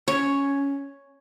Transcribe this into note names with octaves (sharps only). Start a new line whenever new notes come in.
C#4 C#5